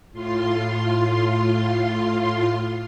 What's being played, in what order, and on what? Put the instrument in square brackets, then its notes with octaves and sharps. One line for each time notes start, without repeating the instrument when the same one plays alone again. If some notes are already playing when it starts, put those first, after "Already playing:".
[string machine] A2 F4 C6